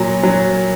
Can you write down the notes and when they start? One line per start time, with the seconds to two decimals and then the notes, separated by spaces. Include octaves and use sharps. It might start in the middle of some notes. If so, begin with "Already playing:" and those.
Already playing: A#2 F#3
0.23 F#3